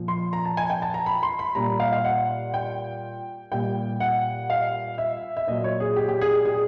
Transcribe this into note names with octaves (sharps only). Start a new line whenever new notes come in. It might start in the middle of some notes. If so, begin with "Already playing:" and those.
Already playing: A#2 F3
C6
A#5
A5
G#5
G5
A5
A#5
B5
C6
B5
A#2 G3 A#5
F5
F5
F#5
G5
A#2 G3 G5
F#5
F5
E5
E5
A#2 F#3 D#5
C#5
G#4
G4
G4
G#4
G4
G#4